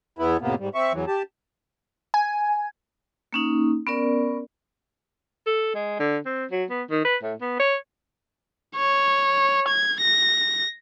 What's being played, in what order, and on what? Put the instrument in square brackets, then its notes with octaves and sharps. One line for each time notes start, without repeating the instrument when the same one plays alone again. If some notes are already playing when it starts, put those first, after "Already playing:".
[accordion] E2 B3 E4
F2 A2 C3 A#3 B3
G#2 G3
C4 E5 C#6
E2 E3 F#3
G4 A5
[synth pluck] G#5
[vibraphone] A#3 C#4 D#4
B3 C#4 A#4 D5
[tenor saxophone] A4
G#3
D3
C4
F#3
B3
D#3
B4
A2
B3
C#5
[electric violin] C#5
G#6
A#6